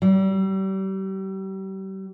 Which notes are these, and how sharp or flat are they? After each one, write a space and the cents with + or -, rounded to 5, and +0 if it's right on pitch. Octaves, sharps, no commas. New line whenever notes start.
G3 -35